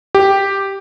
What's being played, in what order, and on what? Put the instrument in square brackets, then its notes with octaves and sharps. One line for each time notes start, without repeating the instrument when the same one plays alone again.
[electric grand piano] G4